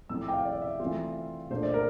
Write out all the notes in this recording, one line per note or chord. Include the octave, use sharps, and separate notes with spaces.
A2 F3 C4 E4 E6
D6
G5
F5
D5
E5
E3 A3 C4 F4
A#2 A3 D4 F4 C5
D5
A#4